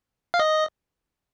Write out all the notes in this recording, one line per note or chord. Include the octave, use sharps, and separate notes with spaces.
F5
D#5